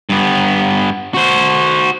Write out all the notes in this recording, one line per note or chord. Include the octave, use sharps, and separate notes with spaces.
G2 B3
F#4 C5